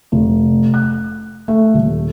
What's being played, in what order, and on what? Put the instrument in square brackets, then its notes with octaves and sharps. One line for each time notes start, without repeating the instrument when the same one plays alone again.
[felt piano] F1
F#6
A3
D#1